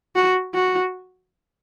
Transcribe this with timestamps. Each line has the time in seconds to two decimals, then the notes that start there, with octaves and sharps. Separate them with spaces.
0.16 F#4
0.55 F#4